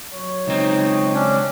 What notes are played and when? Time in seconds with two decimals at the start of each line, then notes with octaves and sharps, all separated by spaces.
0.13 F#3 C#5
0.48 C#2 C4 D#4
1.14 C#4 D4